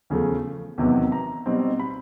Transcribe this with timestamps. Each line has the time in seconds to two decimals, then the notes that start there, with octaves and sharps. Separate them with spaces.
0.10 E2 C#3 F3 A3
0.78 E2 C3 D#3 F#3 B3
1.12 A#5
1.46 B2 G3 C4 D#4
1.80 B5